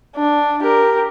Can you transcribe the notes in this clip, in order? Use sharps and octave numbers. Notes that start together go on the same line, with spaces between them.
D4
G4 A#4